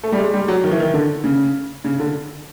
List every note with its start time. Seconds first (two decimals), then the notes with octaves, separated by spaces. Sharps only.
0.03 A3
0.12 G3
0.18 G#3
0.34 G3
0.48 F#3
0.64 D#3
0.71 E3
0.80 D#3
0.94 D3
1.24 C#3
1.84 C#3
1.99 D3